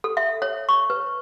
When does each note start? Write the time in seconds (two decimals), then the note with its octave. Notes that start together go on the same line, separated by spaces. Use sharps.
0.04 A4
0.17 E5
0.42 C#5
0.69 C#6
0.90 B4